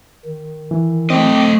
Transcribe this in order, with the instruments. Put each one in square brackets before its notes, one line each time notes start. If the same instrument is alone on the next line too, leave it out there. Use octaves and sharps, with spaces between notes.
[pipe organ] D#3
[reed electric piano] E3
[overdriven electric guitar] A3 D#5 [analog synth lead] C4 [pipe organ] G5 D6